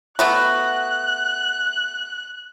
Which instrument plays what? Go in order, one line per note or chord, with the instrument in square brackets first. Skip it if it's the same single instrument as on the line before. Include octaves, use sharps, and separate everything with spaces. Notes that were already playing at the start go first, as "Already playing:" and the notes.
[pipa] A3 B3 F#4 [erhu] F#6